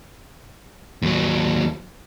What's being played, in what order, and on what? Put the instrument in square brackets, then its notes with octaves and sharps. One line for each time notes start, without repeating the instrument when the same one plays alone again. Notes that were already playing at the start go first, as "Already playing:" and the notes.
[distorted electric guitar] D#2 F#3